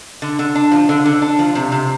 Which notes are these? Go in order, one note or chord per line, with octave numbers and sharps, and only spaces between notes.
D3
D3
D4
F3
D3
D3
D4
F3
C3
C3